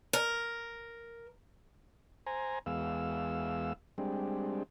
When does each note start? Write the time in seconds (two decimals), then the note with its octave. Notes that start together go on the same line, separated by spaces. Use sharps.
0.13 A#4
2.26 C5 G#5 A#5
2.66 E2 G#3 B3 F5 E6
3.98 G3 G#3 C4 D4